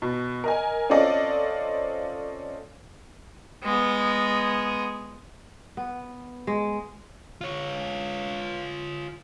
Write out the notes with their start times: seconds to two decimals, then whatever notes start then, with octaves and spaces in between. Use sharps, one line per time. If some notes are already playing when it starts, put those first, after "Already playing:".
0.02 B2
0.44 A#4 D#5 G#5
0.90 C4 C#4 F4 A4 D5 D#5
3.63 G#3 B3
5.77 B3
6.47 G#3
7.41 F4 C#5